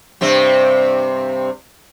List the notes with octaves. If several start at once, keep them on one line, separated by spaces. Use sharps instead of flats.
G2 C3 C4